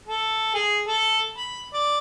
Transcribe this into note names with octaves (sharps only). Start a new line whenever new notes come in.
A4
G#4
A4
B5
D5